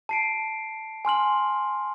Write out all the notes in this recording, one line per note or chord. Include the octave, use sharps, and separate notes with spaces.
A5 C7 D7
G#5 C6 F6 F#7